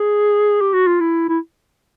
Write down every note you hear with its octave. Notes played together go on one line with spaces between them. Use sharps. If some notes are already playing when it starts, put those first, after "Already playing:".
Already playing: G#4
G4
F#4
F4
E4
E4